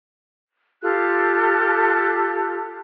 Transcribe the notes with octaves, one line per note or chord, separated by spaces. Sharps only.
F4 G4 A4 F#6